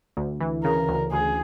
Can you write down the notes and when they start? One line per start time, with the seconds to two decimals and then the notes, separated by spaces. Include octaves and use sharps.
0.17 D2
0.40 E3
0.64 C#3 A#4
0.89 D2
1.12 D2 G#4